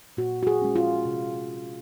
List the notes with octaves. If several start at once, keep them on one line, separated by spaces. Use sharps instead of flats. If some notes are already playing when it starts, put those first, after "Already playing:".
A#2 F#4
F#4
G#4
G#3 C#4
F4
C3